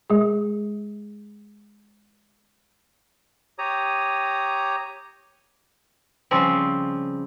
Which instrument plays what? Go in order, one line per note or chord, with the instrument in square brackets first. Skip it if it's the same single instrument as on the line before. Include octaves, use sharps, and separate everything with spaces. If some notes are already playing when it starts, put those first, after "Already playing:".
[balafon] G#3 G#4
[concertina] G4 C#5 A#5 D#6
[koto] C#3 F3 G3 C4